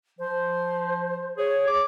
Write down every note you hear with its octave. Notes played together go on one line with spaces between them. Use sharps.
F3 C5
G#4 C#5
D6